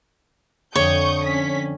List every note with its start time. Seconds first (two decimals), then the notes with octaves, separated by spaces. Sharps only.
0.75 F2 D3 C#5 C#6 D#6 G6
1.25 C#4 B6